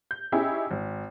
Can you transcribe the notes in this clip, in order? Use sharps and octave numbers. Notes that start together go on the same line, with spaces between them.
G6
C#4 D#4 E4 G4 G#4
G#1